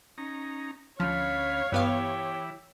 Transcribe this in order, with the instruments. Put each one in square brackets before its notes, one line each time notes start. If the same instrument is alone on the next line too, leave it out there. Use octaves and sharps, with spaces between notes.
[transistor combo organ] C#4 D#4 A#5
[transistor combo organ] D2 C#4 B5 [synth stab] F3 [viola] C#5 [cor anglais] F5
[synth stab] G2 B3 F5 [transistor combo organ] E3 E4 [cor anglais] G4